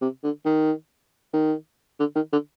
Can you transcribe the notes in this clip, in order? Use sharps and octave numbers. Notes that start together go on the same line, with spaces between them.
C3
D3
D#3
D#3
D3
D#3
D3